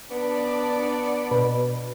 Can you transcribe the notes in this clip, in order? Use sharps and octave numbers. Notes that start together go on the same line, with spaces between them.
B3 D4 D5
B2